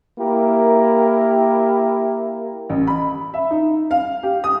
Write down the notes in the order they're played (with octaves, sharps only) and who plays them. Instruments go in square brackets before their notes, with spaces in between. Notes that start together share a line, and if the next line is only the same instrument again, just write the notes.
[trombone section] A#3 E4 G4 A#4
[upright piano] A1
B5
E5
D#4
F5
G4
D#6